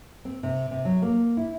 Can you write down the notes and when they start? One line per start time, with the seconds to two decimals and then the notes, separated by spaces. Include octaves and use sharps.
0.25 C4
0.43 C3
0.71 C3
0.85 F#3
1.02 A#3
1.37 E4